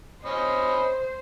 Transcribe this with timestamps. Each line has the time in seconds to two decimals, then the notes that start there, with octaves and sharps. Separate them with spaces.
0.25 C#4 C5 D#5 B5